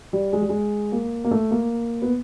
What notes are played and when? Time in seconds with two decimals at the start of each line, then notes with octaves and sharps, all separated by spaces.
0.13 G3
0.33 G#3
0.41 G3
0.49 G#3
0.92 A#3
1.24 A#3
1.31 A3
1.51 A#3
2.02 B3